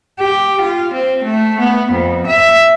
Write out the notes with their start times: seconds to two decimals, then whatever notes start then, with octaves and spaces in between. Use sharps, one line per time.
0.19 G4
0.61 F4
0.94 C4
1.24 A3
1.60 B3
1.92 F2
2.27 E5